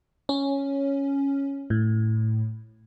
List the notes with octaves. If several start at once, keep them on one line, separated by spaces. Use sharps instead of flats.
C#4
A2